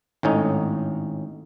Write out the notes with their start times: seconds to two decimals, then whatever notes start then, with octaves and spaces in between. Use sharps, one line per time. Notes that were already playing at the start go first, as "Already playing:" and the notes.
0.23 G#1 A2 C#4 D#4